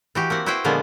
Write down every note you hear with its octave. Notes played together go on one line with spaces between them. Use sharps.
E3 F#4 G4
A#3 C4 F#5
E4 F#4 B4 C5 G5
A#2 D3 F3 G#3 A#3 B3